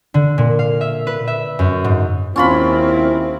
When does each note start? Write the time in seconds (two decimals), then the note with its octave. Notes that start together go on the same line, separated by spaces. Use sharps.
0.14 D3
0.38 A#2
0.59 F5
0.81 E5
1.07 B4
1.28 E5
1.59 F#2
1.84 G#2
2.36 D#2 C4 C#4 E4 F4 B5